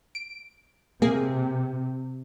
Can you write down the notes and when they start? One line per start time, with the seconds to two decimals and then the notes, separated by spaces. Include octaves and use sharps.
0.15 D7
1.02 C3 A#3 G#4